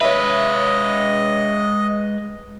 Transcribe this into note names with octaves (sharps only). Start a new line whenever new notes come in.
G#3 B4 C#5 D#5 E5